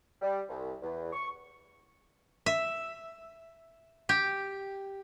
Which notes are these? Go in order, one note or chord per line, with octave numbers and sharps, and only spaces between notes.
G3
C2
E2
C#6
E5
G4